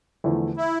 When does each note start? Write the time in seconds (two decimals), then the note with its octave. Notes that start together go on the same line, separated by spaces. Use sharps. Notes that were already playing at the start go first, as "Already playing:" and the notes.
0.24 E2 D3 F3 A3 E4
0.57 E4